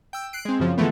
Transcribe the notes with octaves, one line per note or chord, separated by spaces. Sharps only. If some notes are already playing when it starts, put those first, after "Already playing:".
G5 E6
F#6 C7 D7
G#3 C4
F#2 C#3 F3
D3 E3 F3 G#3 A3 B3